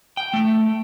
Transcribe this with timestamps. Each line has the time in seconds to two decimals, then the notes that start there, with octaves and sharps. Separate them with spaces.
0.17 G5
0.34 A3